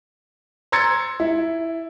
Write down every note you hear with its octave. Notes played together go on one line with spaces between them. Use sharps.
A#5 C6 E6 G#6 A6 C#7
E4